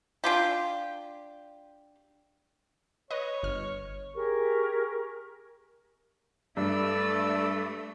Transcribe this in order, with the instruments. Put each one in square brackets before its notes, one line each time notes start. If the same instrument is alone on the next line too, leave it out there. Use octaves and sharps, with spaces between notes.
[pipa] D4 F4 G4
[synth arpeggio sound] B4 D#5 [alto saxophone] C#5
[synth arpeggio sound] G1 F6
[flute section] G4 G#4 A#4 C#6
[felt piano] G2 [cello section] A3 [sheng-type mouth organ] D5 E6